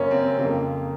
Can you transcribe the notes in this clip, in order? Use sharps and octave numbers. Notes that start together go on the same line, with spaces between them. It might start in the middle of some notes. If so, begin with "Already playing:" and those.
Already playing: F#2 C#3 A#3 C#4
C4
F2 C#3 A#3